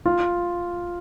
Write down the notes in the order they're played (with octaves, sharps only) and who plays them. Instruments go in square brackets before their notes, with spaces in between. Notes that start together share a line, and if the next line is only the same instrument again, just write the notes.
[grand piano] F4